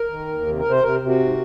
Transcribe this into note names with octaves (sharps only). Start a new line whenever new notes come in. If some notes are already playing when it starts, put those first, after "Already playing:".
Already playing: A#4
D#3
D#2
C3
A#4
C3
C5
C3 A#4
C3
F#4
G#2